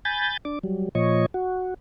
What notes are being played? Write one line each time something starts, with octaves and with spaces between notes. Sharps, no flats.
G#5 B5 G6 A6
D4 D6
F#3 G3
A#2 F3 C#5 D#5 C#6
F#4